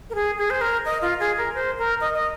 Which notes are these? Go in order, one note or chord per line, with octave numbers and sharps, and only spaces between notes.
A#4
G#4
G#4
C5
A#4
D#5
F4
G#4
A#4
C5
A#4
D#5
D#5